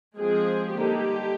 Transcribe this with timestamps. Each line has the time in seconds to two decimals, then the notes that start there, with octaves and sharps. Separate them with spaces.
0.18 F3 G#3 C4 G#4
0.72 D3 G3 A#3 D#4 G4